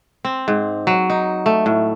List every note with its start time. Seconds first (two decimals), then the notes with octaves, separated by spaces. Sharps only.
0.25 C4
0.48 G#2
0.87 F#3
1.10 D#4
1.46 A3
1.66 A2